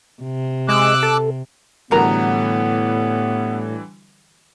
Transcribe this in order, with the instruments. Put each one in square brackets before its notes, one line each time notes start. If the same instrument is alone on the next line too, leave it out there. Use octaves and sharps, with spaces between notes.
[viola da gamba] C3
[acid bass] G#3 [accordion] D6 E6 F#6
[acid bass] A4
[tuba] A2 [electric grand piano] D3 E3 G3 [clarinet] B3 [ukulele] F#4 A#4 A#5